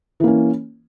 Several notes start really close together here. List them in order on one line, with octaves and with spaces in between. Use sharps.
E3 A#3 C#4